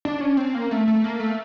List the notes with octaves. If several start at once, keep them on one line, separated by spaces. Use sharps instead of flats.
D4
C#4
C4
A#3
A3
A3
A#3
A3